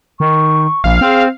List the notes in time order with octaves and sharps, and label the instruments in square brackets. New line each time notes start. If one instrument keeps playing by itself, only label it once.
[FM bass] D#3 [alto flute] C#6
[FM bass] A#1 [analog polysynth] F5
[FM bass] C4 [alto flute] G#4